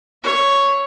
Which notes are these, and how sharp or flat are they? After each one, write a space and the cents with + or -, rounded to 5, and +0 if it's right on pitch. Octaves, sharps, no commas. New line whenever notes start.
C#5 +0 E5 +25